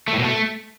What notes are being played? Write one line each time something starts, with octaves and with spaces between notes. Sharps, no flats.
A3
A2
B2
A3